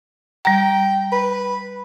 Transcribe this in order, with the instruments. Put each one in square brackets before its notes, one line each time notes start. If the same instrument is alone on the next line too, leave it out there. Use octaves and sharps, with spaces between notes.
[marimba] G3 A#5 [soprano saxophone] G5
[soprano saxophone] B4